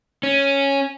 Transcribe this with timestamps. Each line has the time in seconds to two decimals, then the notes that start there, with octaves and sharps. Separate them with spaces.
0.23 C#4